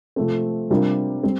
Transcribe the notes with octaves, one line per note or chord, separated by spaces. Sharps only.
C3 F3 A3 C4
C3 G3 D4 F4 A#4
G3 C4